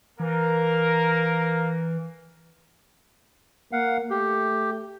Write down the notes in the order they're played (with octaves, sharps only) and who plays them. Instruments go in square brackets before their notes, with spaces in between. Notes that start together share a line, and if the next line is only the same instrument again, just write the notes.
[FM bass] E3 [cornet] A#3 [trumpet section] A#4
[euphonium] A#3 [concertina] F5 F#5
[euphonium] A3 [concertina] G4